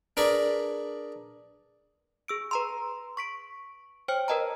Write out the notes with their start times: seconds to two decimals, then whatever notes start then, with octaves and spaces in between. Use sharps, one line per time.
0.17 D4 G#4 A#4 B4 D5 C#6
2.28 G#4 E6 D7
2.51 B4 A#5 C6
3.17 C#6 B6 D7
4.08 C5 C#5 G5 F6 C#7
4.28 A#4 B4 D#5 A5 A#5